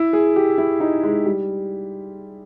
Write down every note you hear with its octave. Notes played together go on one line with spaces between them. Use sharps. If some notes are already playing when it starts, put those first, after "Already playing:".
Already playing: E4
G#4
G4
E4
D#4
G#3
G3